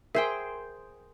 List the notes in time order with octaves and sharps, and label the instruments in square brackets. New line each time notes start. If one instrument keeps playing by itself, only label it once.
[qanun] G#4 C5 G5 [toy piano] A#4 G#5 [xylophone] E5